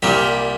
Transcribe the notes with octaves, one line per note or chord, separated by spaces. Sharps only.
C2 A#2 G3 G4 A#4